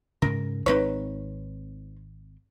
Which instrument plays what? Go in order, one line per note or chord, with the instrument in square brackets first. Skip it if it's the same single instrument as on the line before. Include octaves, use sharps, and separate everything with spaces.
[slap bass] G#2 C#3 [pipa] A#4
[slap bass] G#1 C4 [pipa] D#4 B4 C#5